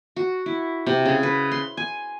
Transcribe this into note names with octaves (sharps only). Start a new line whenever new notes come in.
F#4
E4
C3
C#3
B4
C6
G#5